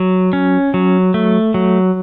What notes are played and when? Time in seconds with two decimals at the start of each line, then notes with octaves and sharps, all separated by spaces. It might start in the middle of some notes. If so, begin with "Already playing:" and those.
Already playing: F#3
0.33 C#4
0.74 F#3
1.14 A3
1.54 F#3